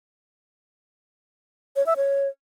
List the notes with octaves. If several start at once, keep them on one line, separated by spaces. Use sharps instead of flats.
C#5
E5
C#5